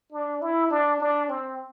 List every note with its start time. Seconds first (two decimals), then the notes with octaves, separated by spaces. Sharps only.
0.12 D4
0.42 E4
0.70 D4
1.00 D4
1.29 C4